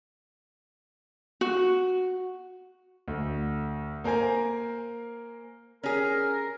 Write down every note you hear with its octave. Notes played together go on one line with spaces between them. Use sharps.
F#4
D2
A#3 A#4 C5 G#5 A#5
C#4 G#4 A#4